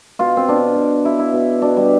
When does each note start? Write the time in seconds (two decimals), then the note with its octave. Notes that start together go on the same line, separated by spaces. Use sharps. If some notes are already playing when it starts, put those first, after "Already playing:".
0.19 B2 F4
0.37 C4
0.48 B2 D4
0.76 B2
1.04 B2 E4
1.19 E4
1.33 B2
1.62 B2 D4
1.77 G3